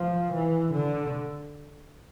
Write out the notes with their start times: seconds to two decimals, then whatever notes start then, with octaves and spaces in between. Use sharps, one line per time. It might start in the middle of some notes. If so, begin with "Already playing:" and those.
Already playing: F3
0.33 E3
0.73 D3